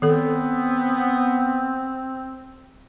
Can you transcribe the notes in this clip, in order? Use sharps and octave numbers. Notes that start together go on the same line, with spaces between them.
D#3 B3 C4 A4